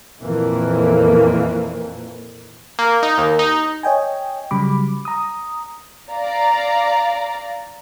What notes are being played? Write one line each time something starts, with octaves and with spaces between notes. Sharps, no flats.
F2 A#2 E3 A#3
A#3
D#4
D#2
D#4
C#5 D#5 G5 G#5
C#3 F#3 G3 B5 D6
A#5 D#6
D5 F5 A#5